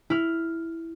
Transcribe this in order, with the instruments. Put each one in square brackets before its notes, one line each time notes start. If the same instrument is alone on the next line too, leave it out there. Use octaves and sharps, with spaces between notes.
[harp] E4 F6